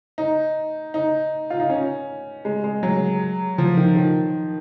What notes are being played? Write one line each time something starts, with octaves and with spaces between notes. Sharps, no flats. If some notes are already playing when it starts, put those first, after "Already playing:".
D#4
D#4
F4
D#4
C#4
G#3
G#3
F#3
F3
D#3
D#3